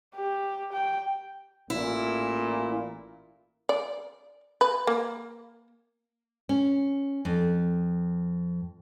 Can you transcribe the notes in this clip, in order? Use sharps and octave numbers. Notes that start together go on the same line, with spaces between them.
G4
G5
A1 A#2 E4
D5
B4
A#3
C#4
F2